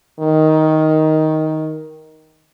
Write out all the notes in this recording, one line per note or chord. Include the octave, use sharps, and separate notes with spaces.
D#3